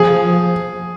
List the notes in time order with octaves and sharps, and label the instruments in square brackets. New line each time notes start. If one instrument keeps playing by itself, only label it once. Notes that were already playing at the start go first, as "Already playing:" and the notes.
Already playing: [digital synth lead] F3 [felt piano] G#4